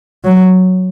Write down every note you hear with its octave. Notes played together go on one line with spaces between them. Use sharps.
F#3